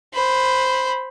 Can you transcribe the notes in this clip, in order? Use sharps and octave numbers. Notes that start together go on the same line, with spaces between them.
C5 B5